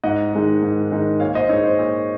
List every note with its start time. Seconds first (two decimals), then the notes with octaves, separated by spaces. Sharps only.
0.04 G#2 D#5 F#5
0.33 D#3 G#3 D#4
0.62 G#2
0.91 D#3 G#3 D#4
1.20 A#2 C#5 F5
1.34 C5 D#5
1.49 D#4 C#5
1.53 G#3
1.64 C5
1.79 A#2 C#5